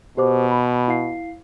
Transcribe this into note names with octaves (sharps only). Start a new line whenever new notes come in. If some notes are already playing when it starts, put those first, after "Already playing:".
B2 G4 C5 D6
B5
E4 F5 C7